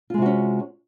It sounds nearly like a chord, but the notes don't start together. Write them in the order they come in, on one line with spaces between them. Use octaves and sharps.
F4 G#3 C3 F#4 C#4